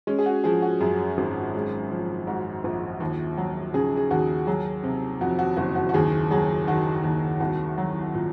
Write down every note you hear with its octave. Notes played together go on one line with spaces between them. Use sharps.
G#3 C#4
G#4
F#4
F3 G#4
F#4
F#2 G#4
G#1
G#3
F3
G#2 F#4
A#1
D#2
F#3
C#3 G#4
G#4
D#2 F#4
F#3 G#4
C3
F2 F#4
F#4
F#1 F#4
F#4
F#4
D#2 G#4
F#3 G#4
D#3 F#4
D#2
C2 F#4
F#3
A#2